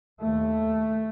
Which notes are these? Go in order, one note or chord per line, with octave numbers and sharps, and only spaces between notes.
D#2 A3